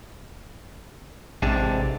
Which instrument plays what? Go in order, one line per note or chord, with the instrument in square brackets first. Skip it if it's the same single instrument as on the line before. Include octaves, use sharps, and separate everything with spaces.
[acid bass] A1 [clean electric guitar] G#2 C3 D4